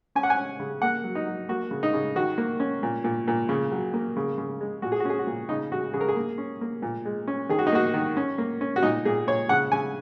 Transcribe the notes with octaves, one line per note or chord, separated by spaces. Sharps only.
C#4 G#5
F#5
G#5
C#4
C#3
A#3 F#5
F#3
D#4
F#3
A#3 F#4
C#3
D#4
C#3
D#3 F#4
A#3
C#4
A#2
A#2
A#2
C#3
F#3
A#3
C#3
C#3
G#3
A#2 F#4
G#4
F#4
C#4 G#4
F#4
A#2
C#3 D#4
C#3 F#4
C#3 G#4
A#4
G#4
A#3
C#4
A#3
A#2
G#3
C#4
D#3 G#4
F#4
D#4
A#3 F#4
D#3
C#4
A#3
C#4
F#4
A#2 D#4
A#2 G#4
A#2 C#5
C#3 F#5
C#3 G#5